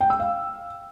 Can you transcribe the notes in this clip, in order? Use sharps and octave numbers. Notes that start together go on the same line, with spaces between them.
G5
E6
F5